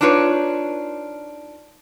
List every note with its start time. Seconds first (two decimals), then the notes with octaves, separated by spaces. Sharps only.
0.01 D4 D#4 F4 B4 C#5